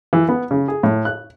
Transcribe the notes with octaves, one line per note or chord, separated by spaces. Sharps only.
E3
B3
C#3
G#4
A2
F#6